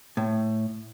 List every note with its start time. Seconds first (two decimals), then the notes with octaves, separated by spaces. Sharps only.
0.17 A2